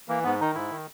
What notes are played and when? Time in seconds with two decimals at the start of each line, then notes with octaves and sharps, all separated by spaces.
0.08 E3 A#3
0.24 G#2 B3
0.41 D#3 D#4
0.55 G#2 E4
0.71 D#3